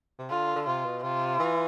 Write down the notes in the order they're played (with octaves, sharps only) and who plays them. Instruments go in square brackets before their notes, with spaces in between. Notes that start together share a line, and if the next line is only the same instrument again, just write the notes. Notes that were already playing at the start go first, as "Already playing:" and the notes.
[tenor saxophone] C3
[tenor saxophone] D3 [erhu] F4
[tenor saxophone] D3
[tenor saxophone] C3 [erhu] F4
[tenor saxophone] B2
[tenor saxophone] C3 [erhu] F4
[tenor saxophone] E3